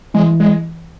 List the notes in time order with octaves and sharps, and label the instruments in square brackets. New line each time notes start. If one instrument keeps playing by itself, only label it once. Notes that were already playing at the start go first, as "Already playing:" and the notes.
[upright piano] E3 [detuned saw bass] G#3
[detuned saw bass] G#3